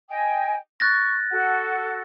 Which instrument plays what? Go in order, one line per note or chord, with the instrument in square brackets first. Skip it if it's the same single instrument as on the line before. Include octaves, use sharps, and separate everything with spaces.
[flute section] D#5 G5 G#5
[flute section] C#6 [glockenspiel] F#6 A6 A#6
[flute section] F#4 A4 F#5